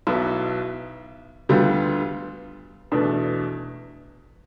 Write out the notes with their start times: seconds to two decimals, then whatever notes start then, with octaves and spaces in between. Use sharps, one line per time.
0.07 B1 B2 B3 E4
1.49 D2 D3 G3 B3 F4
2.92 E2 B2 A3 D4